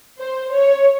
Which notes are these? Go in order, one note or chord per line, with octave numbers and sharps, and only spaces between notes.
C5
C#5